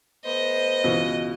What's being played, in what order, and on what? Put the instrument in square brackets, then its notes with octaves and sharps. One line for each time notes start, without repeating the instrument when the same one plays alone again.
[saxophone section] A3 B3 C5 [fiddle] D#5
[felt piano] C#2 B2 E3